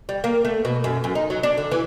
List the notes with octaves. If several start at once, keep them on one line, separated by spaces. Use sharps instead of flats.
G3
A#3
A3
B2
F#2
F#2
D#4
F#3
D4
D3
E3